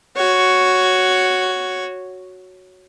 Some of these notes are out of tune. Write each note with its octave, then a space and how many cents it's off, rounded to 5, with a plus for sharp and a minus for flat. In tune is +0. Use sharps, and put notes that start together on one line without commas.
F#4 +0 C#5 +0